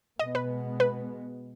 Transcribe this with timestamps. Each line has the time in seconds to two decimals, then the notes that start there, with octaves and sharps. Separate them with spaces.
0.19 B2 G#3 B3 D#5
0.35 B4
0.80 B4